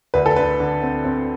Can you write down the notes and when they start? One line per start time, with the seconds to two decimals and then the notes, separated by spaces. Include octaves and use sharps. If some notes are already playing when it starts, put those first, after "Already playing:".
0.14 D2 B4
0.26 A4
0.36 D3 B4
0.60 D3
0.82 C4
1.04 C4